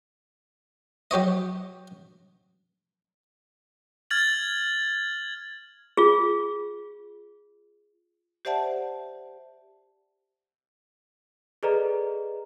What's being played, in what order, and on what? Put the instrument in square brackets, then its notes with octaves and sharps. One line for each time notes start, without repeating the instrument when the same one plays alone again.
[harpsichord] F#3 G4 C#5 D#5
[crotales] F6 G#6 A6 F#7
[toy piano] F4 G#4
[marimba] G4 C5 D5 E5 F#5 A5
[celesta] G#4 A4 B4 D5 D#5 A#5